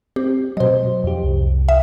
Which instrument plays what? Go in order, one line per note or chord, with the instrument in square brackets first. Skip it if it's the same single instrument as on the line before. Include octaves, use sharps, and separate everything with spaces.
[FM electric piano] C4 [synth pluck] G4
[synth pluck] B2 F#3 [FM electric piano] C5 D#5
[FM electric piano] F2 G4
C2
[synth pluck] E5